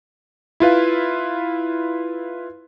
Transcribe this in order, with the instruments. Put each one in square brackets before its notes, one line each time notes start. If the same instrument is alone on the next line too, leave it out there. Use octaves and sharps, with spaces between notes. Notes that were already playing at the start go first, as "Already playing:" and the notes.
[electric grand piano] E4 F4 B4 F5